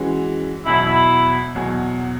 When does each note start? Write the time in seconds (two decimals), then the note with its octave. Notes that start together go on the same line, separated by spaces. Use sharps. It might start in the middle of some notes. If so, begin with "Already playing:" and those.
Already playing: E3 G#3 C#4 F#4
0.66 E2 B2 F#3 E4
0.85 E4
1.55 E2 B2 F#3